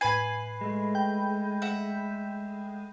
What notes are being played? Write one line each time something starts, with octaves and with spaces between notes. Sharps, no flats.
A2 B4 G#5 B5 C7
G#3 A3
G5 B5 G6
E5 F#5